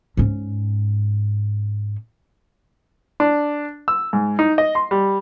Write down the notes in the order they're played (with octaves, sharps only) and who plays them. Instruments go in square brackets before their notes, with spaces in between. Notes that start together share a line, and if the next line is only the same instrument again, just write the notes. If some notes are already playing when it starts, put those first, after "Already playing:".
[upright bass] G#2 C#4
[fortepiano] D4
E6
G#2
D#4
D#5
C6
G3